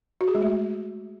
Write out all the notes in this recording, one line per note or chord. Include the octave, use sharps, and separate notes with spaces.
F#4
G#4
G#3
A3